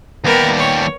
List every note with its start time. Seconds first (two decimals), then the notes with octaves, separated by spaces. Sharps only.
0.24 D#2 G3 B3 A#4
0.59 C#5